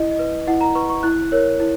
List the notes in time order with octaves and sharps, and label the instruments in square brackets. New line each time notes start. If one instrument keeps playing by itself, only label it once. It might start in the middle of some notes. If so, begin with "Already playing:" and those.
Already playing: [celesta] E4 D#5
D#5
B4
E4 F#5
A#5
B4 C#6
C#6
E4 F#6
A#4 C#5
E4